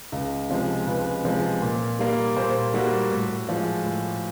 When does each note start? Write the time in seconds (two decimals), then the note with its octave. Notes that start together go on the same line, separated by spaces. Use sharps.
0.12 C#2
0.49 C3 F3 G#3
0.86 C#2 B4
1.24 C3 F3 G#3
1.62 A#2
1.99 G3 A#3
2.36 A#2 C5
2.74 G3 A#3 F#4
3.11 A2
3.49 F3 G#3
3.86 A2